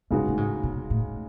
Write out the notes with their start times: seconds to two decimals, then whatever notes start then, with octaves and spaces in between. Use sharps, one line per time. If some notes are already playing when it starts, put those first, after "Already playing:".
0.10 F#2 C#3 G#3 D#4 F#4
0.28 A2
0.37 G#2
0.63 B2
0.90 A2